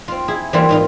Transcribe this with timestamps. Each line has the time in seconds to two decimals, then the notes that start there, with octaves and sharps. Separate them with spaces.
0.08 C4 F4
0.28 E4 G#4
0.53 E3 G3 A#3 C4 E4 F4
0.69 G#2 D#4 F4